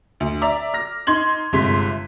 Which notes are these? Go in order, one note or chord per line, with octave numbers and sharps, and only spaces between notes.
D2
D5 E5 A#5 D6
F6 A#6
D#4 C6 G#6 F#7
G1 C3 G#3 C6 B6